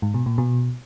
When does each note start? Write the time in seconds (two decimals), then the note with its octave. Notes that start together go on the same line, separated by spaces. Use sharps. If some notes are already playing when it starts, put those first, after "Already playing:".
0.02 G#2
0.14 B2
0.26 A#2
0.38 B2